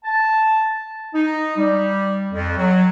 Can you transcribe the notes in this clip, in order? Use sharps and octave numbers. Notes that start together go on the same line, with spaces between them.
A5
D#4
G3
F2
F#3